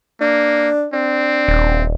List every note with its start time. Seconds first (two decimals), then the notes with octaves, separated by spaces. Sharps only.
0.21 A#3 D4
0.93 C4 D4
1.48 D#1